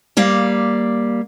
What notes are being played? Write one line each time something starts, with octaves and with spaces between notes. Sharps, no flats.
G3 A#3 F5